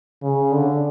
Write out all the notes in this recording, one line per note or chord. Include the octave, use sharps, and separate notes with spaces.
C#3
D3